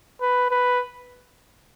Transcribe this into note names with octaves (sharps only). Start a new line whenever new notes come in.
B4
B4